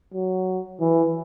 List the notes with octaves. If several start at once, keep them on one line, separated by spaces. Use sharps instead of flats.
F#3
E3